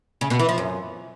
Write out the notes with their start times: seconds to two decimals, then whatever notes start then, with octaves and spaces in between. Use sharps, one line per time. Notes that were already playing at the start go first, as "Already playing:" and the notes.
0.21 C#3
0.30 B2
0.39 E3
0.49 F3
0.58 F#2